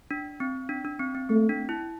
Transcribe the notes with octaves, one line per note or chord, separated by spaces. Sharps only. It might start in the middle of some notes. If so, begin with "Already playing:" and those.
D4
C4
D4
D4
C4
C4
A3 C4
D4
E4